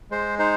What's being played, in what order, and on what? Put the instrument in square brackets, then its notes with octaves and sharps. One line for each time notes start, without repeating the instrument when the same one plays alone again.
[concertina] G#3 C5
D#4 C5